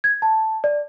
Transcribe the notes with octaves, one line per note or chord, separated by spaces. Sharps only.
G#6
A5
D5